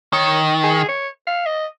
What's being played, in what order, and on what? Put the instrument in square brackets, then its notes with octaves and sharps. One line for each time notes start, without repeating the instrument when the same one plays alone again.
[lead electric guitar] D#3 [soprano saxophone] C#5
[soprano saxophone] G#4
C#5
F5
D#5